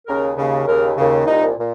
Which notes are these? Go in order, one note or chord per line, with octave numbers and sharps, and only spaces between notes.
D#2 C#3 A#4
D#2 C#3
D#2 C#3 A#4
D#2 C#3
C2 A#2 D#4
A#2